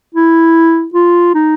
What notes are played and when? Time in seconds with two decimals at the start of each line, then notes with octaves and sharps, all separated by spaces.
0.15 E4
0.94 F4
1.34 D#4